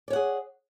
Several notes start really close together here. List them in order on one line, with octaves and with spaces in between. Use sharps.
D5 C#5 F#5 G#4